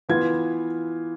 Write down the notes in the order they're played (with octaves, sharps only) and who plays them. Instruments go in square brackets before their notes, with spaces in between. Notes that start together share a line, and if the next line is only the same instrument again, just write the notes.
[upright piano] E3 B3 F4 G#6